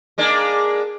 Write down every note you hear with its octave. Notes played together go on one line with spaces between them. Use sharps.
G#3 A#3 D4